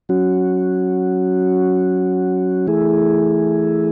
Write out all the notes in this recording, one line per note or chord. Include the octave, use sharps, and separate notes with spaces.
F#3 C#4 F#4
E3 A3 E4 G#4